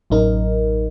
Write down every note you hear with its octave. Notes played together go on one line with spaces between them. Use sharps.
A1 F#2 D#4 A#4